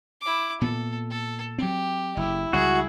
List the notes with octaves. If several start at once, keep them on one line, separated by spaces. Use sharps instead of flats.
E4 D6
A#2 B3 A4
A4
F#3 C4 G4
F#1 E4
C#2 G3 F#4 G#4